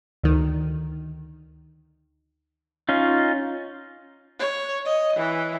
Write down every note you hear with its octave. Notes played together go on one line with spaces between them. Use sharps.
D2 D#3
C#4 D#4 F4
C#5
D#5
E3